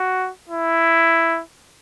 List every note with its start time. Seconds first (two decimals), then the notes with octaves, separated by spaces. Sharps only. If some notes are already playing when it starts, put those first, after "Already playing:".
Already playing: F#4
0.49 E4